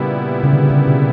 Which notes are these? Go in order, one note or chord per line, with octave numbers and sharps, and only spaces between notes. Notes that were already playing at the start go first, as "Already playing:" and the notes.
Already playing: A#2 C#3 G3 B3 E4
C#3
D3
C#3
B2